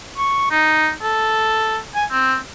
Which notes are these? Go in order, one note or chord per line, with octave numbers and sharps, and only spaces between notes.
C#6
D#4
A4
G#5
C4